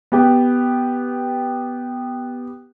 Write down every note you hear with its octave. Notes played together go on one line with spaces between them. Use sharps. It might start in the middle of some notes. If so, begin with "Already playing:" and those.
B3 G4